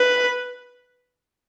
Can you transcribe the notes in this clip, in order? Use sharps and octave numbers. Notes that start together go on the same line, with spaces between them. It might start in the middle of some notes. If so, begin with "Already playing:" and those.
Already playing: B4